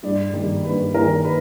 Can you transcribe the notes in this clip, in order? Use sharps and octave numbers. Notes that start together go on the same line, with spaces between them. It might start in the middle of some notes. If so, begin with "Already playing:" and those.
G2 D5
D#3 G3 A#3
G2 B4
D#3 G3 A#3 A#4
B4